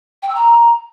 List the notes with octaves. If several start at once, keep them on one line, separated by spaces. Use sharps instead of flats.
G5
E6
A#5